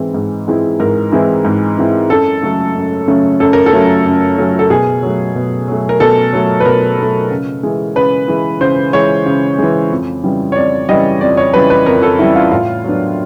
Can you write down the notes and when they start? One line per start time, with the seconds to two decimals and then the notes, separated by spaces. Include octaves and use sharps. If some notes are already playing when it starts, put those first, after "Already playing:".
Already playing: G#2 E3 G#3 C4 E4
0.14 G#2
0.47 E3 G#3 C4 E4
0.80 G#2 A#4
1.12 E3 G#3 C4 E4
1.45 G#2
1.77 E3 G#3 C4 E4
2.10 F#2 A4
2.42 C#3 F#3 A3 C#4
2.75 F#2
3.07 C#3 F#3 A3 C#4
3.40 F#2 A4
3.53 A#4
3.66 A4
3.73 C#3 F#3 A3 C#4
4.05 F#2
4.38 C#3 F#3 A3 C#4
4.59 A4
4.70 B2 G#4
5.03 F#3 A3
5.35 B2
5.68 F#3 A3
5.89 A#4
6.00 B2 A4
6.33 F#3 A3
6.60 B4
6.65 B2 A#4
6.98 F#3 A3
7.30 C#3
7.63 E3 G#3
7.96 C#3 B4
8.28 E3 G#3
8.61 C#3 C5
8.93 E3 G#3 C#5
9.26 C#3
9.58 E3 G#3
9.91 F2
10.24 C#3 E3 G3
10.52 C#5
10.56 F2 D5
10.89 C#3 E3 G3 D#5
11.21 F2 D5
11.37 C#5
11.53 C#3 E3 G3 B4
11.70 B4
11.86 F2 A#4
12.02 A4
12.19 C#3 E3 G3 E4
12.35 F4
12.51 A2 F4
12.84 F#3 B3 D4